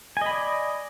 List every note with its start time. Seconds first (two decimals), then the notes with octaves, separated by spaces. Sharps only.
0.17 G#5
0.21 D#5
0.26 B5
0.31 D5